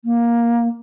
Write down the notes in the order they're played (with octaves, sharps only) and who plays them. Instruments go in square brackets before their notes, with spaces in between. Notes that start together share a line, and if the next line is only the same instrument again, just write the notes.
[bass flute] A#3